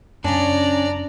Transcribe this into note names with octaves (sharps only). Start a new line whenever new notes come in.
F#2 C#3 C#4 D4 D5 A#5